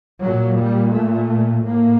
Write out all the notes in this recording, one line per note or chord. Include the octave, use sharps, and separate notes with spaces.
A#2 F#3
G3
A3
A2 A#3